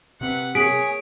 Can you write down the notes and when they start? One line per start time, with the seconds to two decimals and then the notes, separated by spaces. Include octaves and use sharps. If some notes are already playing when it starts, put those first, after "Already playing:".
0.21 C3 C4 B4 F#5
0.55 A#3 G#4 C#5 B6 D7